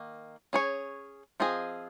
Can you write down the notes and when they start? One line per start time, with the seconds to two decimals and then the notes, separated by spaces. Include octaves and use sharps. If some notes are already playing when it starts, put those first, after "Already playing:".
Already playing: D#3 A#3
0.53 C#4 G#4 C#5
1.40 F3 C4 F4 G#4 D#5